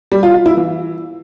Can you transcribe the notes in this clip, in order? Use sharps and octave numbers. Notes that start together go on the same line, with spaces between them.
G3
F4
F4
E4
E3